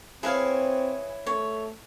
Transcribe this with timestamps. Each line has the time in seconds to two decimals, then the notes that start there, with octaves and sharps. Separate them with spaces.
0.23 C4 E4 G#4 B4 C#5 F5
1.27 A3 C#5